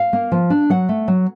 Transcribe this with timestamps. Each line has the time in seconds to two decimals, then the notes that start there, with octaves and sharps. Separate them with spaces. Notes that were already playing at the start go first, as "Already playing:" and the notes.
Already playing: F5
0.13 A#3
0.32 F3
0.50 D4
0.70 F#3 F#5
0.89 A3
1.08 F#3